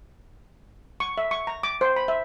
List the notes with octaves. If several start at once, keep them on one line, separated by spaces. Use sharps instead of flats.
C#6
E5
C#6
A#5
D6
C5
B5
E5